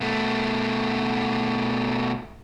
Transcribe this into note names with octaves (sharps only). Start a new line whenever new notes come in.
B2 A3